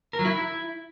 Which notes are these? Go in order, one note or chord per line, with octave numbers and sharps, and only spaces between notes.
A#4
F#3
E4